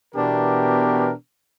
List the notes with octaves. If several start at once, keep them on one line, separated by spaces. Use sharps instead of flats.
B2 E3 B3 D4 G4 A#4